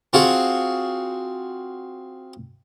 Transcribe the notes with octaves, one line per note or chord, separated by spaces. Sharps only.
C4 F4 F#4 G#4